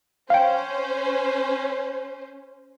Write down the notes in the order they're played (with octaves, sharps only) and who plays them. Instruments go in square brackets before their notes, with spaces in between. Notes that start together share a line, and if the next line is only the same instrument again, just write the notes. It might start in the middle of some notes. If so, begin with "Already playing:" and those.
[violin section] C#4 C5 [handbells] F5 G5